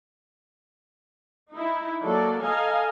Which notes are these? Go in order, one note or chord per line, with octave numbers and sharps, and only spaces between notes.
D#4 E4
F#3 A#3 A4 D5
A4 D#5 F5 G#5 A#5